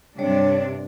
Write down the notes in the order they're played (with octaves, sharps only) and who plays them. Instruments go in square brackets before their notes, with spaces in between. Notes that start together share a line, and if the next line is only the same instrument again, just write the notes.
[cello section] G2 C3 D4 [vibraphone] G3 C#5 D5